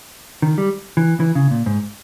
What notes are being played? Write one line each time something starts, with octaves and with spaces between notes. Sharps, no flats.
D#3
G3
E3
E3
C#3
A#2
G#2